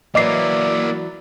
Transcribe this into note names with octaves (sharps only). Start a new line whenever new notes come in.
E3 F#3 A#3 E4 D5 D#5 D6 C7